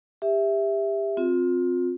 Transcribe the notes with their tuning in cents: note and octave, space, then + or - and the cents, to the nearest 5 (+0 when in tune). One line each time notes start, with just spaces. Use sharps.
G4 +25 E5 +0
C4 +0 F4 +30